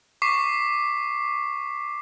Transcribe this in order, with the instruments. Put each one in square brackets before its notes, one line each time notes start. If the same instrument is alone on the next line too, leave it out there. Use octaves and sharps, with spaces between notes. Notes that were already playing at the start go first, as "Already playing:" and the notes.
[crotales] C#6 D6 B6 C7